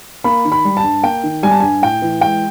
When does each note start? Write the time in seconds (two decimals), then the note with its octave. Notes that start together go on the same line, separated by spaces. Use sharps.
0.24 A#3 B5
0.45 D#3
0.52 B5
0.65 G3
0.77 A5
0.83 G2
1.03 A#3 G5
1.23 D#3
1.43 G3 G#5
1.51 A5
1.60 G2 G#5
1.82 A2 G5
2.02 E3
2.21 G#3 G5